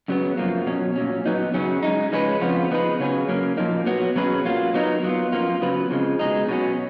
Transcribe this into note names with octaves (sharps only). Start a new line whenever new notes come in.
F#2 C#3 F#3 B3
F#2 F3 A#3
B2 F#3 C#4
A#2 F#3 C#4
F#3 B3 D#4
F#2 C#3 F#3 C#4
C#3 G#3 D#4
F3 G#3 C#4 F4 B4
F2 C#3 F3 B3 F4
F3 B3 D#4 G#4 B4
C#3 F#3 C#4 G#4 B4
F#3 A#3 C#4
A#2 F3 A#3 D#4
F#3 B3 F#4
B2 F#3 C#4 G#4 B4
F#3 A#3 F4
F#3 B3 D#4 A#4
F#3 B3 F4
F#2 F3 A#3 F4
C#3 F#3 B3 F4 B4
F2 C#3 F3 G#3
B2 G#3 D#4
B2 F#3 C#4